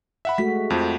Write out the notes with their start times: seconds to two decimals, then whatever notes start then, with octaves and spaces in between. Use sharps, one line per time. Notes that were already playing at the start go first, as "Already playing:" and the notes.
0.25 E5 F#5 B5
0.38 G#3 A3 F#4 B6
0.70 F2 F3